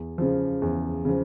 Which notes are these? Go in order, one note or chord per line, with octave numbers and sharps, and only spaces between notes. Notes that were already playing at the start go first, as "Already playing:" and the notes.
Already playing: E2
C#3 F3
E2
C#3 F3